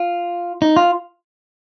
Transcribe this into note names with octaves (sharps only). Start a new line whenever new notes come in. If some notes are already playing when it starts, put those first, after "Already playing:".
Already playing: F4
D#4
F4